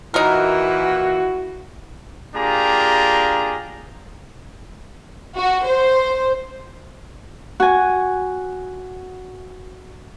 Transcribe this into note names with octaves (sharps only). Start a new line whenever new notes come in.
A#2 E3 D#4 E4 F#4 A#4
A#3 D4 F4 G4 G#4 A#5
F#4
C5
F#4 G#5